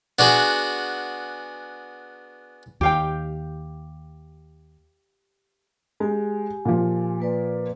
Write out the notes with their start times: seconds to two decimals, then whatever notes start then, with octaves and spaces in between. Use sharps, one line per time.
0.19 B3 D4 F#4 G#4
2.81 D#2 G4 F5 G5
6.00 G#3 G4 G#5
6.65 A#2 F3
7.20 A#3 B4 D5